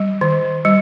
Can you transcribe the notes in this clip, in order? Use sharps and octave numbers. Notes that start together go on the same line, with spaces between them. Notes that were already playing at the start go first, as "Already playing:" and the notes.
Already playing: G3
D#3
G3